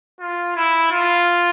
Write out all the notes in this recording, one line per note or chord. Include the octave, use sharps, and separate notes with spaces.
F4
E4
F4